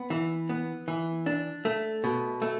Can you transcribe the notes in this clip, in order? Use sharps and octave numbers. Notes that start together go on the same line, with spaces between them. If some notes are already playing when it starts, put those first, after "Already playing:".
Already playing: B3
E3
B3
E3
D4
A3
B2
A3